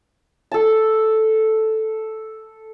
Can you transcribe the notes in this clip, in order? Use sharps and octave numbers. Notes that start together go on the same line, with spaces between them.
A4 A5